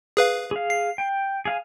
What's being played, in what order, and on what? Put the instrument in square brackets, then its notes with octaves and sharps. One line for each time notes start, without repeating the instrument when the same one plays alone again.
[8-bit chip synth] G#4 B4 F5
[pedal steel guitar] G#4 F5
[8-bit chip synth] C7
[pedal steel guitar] G5
G#4 F5 G#5